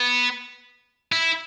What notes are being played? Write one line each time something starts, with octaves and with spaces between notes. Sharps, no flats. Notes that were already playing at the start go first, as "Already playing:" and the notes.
Already playing: B3
E4